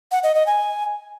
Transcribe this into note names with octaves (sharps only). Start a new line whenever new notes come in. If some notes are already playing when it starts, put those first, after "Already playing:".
F#5
D#5
D#5
G#5